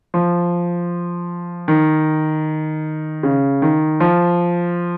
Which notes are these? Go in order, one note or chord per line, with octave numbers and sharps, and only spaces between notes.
F3
D#3
C#3
D#3
F3